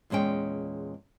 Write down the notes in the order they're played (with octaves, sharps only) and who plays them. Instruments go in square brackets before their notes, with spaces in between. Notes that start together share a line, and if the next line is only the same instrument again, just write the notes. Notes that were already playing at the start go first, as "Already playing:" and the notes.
[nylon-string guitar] E2 A#2 G#3 C#4 G5